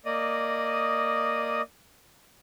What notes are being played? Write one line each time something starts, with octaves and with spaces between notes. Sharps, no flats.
A#3 D5 D#5 D#6